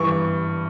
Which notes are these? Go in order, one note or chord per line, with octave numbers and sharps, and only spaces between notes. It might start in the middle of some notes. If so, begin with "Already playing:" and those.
Already playing: G2 E3 C#6